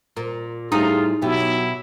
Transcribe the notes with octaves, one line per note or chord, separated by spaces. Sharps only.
A#2
A2 G3 A3 D#4 F4 G#4
B2 F#3 E4 G4